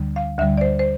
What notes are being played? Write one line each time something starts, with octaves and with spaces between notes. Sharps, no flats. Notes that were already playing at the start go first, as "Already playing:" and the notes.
Already playing: D2 D3 G3
F5
D2 D3 G3 E5
D5
C5
C5